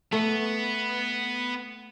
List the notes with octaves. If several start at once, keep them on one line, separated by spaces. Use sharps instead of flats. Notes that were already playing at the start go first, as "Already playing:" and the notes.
A3 B3